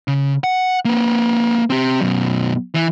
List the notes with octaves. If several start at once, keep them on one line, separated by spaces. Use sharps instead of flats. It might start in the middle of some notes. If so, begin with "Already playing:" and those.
C#3
F#5
A#3 B4
C4 G4
F#2 B2
E3